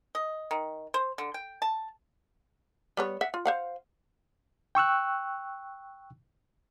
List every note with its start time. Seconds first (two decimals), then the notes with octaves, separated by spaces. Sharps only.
0.15 D#5
0.51 D#3
0.94 C5
1.18 D3
1.34 G5
1.62 A5
2.97 G3 B3 C#5
3.21 E5 F#5
3.34 F4
3.45 C5 F5 F#5
4.75 G5 C#6 E6 F#6